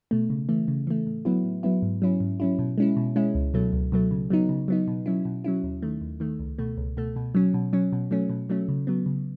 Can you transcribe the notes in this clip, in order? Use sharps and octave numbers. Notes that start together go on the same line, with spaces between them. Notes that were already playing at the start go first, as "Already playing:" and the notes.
B2 A3
C#3
E3 A3
C#3
E3 A3
A2
F#3 B3 E4
A2
F#3 B3 E4
G#2
F#3 C#4 E4
G#2
F#3 C#4 E4
B2
G#3 C#4 E4
B2
G#3 C#4 E4
C#2
B2 F#3 A3
C#2
B2 F#3 A3
C#3
F#3 B3 D#4
C#3
F#3 B3 D#4
B2
F#3 C#4 E4
B2
F#3 C#4 E4
D#2
D#3 A3
D#2
D#3 A3
C#2
B2 A3
C#2
B2 A3
B2
F#3 C#4
B2
F#3 C#4
B2
F#3 A3 C#4
B2
F#3 A3 C#4
C#3
F#3 B3
C#3